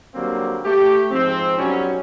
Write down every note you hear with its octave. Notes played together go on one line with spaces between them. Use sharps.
D3 F#3 G3 A#3 C4
A3 G4
G#2 F3 C4
B1 F#3 G3 C#4